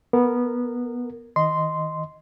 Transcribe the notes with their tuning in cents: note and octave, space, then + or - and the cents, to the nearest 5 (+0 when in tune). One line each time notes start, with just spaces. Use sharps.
B3 -15 A#4 -15
D#3 +30 D#5 +0 C6 -10